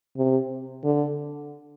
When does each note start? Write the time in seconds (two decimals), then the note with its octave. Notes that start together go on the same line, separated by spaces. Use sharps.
0.17 C3
0.84 D3